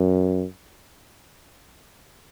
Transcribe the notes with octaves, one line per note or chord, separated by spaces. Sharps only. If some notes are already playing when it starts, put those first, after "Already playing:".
Already playing: F#2